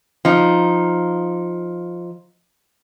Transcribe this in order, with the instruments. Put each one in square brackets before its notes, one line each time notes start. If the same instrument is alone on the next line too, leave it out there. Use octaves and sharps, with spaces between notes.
[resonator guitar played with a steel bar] F3 D#4